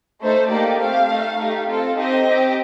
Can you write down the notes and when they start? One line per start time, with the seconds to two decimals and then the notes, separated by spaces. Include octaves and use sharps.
0.21 A3 D#4 A4 C5
0.50 A#3 D#4 G4 D5
0.79 A3 C4 G4 F5
1.09 A3 D#4 A4
1.38 A3 D#4 G4
1.67 C4 F4 A4
1.96 C4 D#4 G4 D#5
2.26 C4 G4